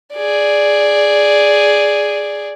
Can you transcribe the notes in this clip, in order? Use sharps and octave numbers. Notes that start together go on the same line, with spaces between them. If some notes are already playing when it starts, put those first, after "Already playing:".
G#4 D5